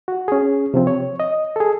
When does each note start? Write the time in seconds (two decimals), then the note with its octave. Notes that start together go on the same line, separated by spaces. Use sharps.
0.08 F#4
0.28 C#4 G#4
0.74 C3 F3 C4
0.87 C#5
1.20 D#5
1.56 G#4 A4